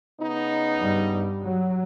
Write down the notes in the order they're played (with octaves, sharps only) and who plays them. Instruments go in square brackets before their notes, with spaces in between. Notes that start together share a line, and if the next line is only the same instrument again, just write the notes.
[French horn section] C#3 B3 D#4
[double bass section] G2 G3
F#3